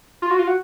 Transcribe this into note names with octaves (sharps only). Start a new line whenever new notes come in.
F4
F#4
F4
F#4